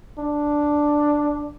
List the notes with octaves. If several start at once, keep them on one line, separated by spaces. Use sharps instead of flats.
D4